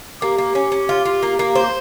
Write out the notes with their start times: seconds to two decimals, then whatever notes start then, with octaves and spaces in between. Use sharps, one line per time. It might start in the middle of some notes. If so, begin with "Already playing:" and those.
0.22 A#3 G4
0.38 A#3
0.55 C#4
0.72 C#4
0.89 F4
1.05 F4
1.23 A#3
1.39 A#3
1.56 C5